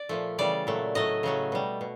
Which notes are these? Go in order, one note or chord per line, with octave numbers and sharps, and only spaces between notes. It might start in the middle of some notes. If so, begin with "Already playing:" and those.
Already playing: D5
A#2 F3 A3
C#3 E3 G3 D5
A#2 F#3 A3
A2 F#3 A3 D#5
C#3 F#3 A3
B2 G3
B2